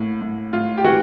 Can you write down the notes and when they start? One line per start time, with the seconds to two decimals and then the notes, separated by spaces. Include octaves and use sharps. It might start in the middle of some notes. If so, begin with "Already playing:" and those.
Already playing: A2 A#3
0.22 A2
0.53 A2 F4
0.77 G4
0.84 E3 F#4